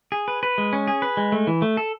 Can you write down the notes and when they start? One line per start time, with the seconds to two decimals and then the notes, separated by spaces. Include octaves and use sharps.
0.12 G#4
0.28 B4
0.43 B4
0.58 G#3
0.73 C#4
0.87 G#4
1.02 B4
1.17 G#3
1.32 A3
1.47 E3
1.62 A3
1.77 A4